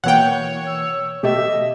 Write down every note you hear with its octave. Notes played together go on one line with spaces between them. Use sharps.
B2 E3 A#3 C#5 F#5 G5
E6
B2 A3 G4 D#5 E5